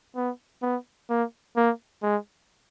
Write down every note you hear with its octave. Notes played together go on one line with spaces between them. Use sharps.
B3
B3
A#3
A#3
G#3